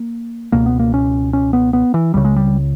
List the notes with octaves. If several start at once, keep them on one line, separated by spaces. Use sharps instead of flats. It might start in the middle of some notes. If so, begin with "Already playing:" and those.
Already playing: A#3
C#2 B2 A#3
B3
A#3
C#4
C#4
B3
B3
E3
C#2 C#3 G3
G#3
G3